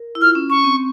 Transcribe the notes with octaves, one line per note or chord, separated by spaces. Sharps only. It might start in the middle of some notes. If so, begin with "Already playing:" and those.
Already playing: A#4
E4
F4 F6
C#4
C#4 C#6
C4